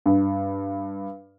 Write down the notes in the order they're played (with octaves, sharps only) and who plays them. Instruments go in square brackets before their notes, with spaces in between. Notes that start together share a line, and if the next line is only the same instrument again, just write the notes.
[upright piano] G2